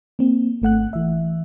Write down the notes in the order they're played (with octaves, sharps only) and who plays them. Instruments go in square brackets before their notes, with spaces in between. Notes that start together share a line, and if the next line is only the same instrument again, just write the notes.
[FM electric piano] A#3 C4
G#1 A3 F#5 F#6
E3 E5